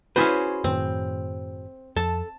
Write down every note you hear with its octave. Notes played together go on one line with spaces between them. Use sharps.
C#4 E4 F#4 G#4 B4 C5
F#2 A2 D#3 C4
F2 A4 A5